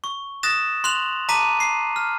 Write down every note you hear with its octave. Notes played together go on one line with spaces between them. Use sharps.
C#6
D#6 F#6 A6 A#6 E7
C6 F#6 F7 F#7
A5 A#5 D6 B6 D#7
C7
F6